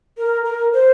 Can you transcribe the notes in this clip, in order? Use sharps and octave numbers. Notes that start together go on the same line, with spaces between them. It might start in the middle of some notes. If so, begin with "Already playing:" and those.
A#4
A#4
C5